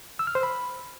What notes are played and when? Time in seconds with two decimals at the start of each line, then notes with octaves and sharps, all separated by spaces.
0.19 E6
0.27 F6
0.35 C5
0.43 B5